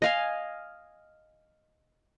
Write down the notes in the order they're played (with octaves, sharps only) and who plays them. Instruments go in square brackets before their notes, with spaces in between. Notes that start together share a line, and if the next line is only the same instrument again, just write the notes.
[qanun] D#5 F5 G#5